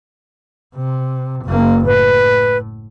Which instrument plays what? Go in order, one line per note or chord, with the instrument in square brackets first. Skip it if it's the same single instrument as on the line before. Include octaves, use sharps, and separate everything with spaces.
[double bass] C3
F#1 A#3
[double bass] A2 [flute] B4